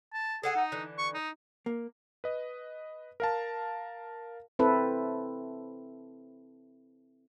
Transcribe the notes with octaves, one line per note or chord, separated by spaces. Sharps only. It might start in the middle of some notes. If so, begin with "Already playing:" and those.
A5
G#4 A4 F#5 G#5
D#4
D3 E3
C#6
D#4
A#3
B4 D#5
A#4 F5 A5
C4 E4 A4 B4